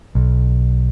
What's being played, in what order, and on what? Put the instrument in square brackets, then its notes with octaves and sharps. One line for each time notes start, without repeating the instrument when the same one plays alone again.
[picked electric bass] B1